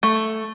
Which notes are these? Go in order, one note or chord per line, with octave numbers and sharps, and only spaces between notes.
A3